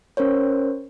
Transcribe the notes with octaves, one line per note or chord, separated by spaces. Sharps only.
C#4 A#4 C5 C#5